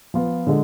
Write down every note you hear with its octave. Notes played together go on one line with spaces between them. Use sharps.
F3 B3 F4
D3 G#3